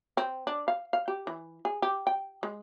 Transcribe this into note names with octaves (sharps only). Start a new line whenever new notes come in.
C4
D4
F5
F5
G4
E3
G#4
G4
G5
G#3